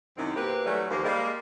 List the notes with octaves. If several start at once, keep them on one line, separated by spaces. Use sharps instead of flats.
F#2 C3 D#3 C4 D#4 E4
B2 A#3 C4 G4 B4
E3 F#3 G3 A3
D#2 F3 A#3
G3 G#3 A#3